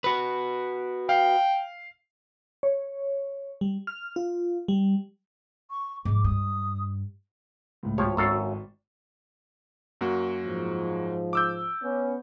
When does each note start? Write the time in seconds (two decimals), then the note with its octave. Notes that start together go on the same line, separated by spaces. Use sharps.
0.04 F#4 B4
1.09 F5 G5
2.63 C#5
3.61 G3
3.87 F6
4.16 F4
4.68 G3
5.70 C#6
6.05 G#2 F3 D6
6.24 G2 D#6
7.83 C#2 A2
7.98 G#1 F3 G4 C#5
8.17 G#1 F#2 A4 F5 C#6 A6
10.01 F#2 A#3 F#4
10.45 G#2 F3
11.33 D6 E6 G6
11.83 B3 C#4